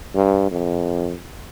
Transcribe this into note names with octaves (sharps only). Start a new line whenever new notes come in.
G2
F2